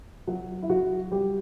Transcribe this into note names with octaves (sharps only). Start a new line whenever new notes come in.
F#3 F#4
E4
F#3 F#4
G3 G4